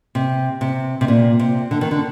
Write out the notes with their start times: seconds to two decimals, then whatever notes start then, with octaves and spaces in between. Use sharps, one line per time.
0.15 C3
0.61 C3
1.01 C3
1.08 A#2
1.39 C3
1.71 D3
1.81 D#3
1.91 D3